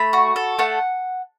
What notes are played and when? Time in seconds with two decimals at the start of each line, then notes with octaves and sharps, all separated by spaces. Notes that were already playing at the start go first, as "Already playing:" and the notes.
Already playing: A3 B5
0.13 F#4
0.36 A4
0.59 A3 F#5